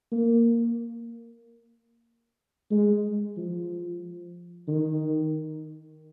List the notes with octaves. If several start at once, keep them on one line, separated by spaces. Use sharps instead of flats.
A#3
G#3
F3
D#3